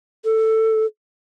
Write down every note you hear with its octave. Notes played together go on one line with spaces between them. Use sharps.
A4